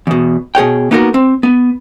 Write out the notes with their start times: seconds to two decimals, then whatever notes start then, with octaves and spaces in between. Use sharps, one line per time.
0.07 E2 B2
0.55 B2 G#4 C#5 G5
0.91 A#3 B3 D#4 F#4 G#4 A#4
1.14 C4
1.43 B3